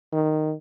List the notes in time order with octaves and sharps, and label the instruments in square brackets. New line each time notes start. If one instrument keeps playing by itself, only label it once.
[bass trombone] D#3